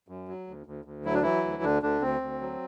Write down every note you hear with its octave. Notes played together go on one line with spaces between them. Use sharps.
F#2
F#3
D2
D2
D2
F#3 E4
D4
E3 F#3 E4
D2
D2 D3 D4
D2 D3 D4
D2 C4
D2
F#3